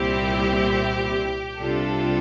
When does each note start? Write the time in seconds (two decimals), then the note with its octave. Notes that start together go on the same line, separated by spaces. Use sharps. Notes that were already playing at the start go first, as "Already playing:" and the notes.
Already playing: C2 A#2 G3 C4 E4 G4
1.59 C2 C3 G3 D4 F4 A4